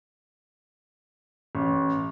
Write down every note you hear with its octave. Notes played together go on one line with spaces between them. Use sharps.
A1